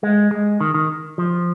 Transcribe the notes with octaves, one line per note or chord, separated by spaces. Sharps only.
G#3
G#3
D#3
D#3
F3